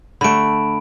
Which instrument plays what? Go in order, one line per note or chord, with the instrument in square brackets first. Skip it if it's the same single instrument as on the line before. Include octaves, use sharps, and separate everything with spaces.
[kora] D3 A3 [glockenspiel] B5 D7